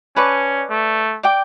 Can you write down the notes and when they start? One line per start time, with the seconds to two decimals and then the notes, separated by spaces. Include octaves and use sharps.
0.16 C#4 B4 D5 A5 C#6
0.70 A3
1.23 D5 G5 D6